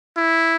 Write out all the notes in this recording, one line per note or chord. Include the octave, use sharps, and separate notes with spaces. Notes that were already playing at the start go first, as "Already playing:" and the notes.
E4